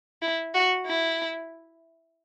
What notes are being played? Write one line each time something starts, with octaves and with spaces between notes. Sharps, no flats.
E4
F#4
E4